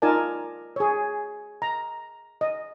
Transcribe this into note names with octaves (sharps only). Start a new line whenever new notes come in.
D#4 F4 A#4 D5 G#5 A5
G#4 C#5
A#5
D#5